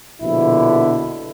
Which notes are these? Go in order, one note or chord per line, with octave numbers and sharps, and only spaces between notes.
A#1 B2 D3 E4